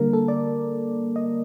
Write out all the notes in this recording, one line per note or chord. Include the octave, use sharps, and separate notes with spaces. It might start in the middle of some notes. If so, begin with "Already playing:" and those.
Already playing: D3 G3 A#3 A#4
A4
D5
D#5